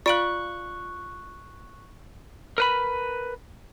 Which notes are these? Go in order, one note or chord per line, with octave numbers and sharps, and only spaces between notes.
F4 D5 F5 C#6 F#6 D7 F#7
A#4 B4 B5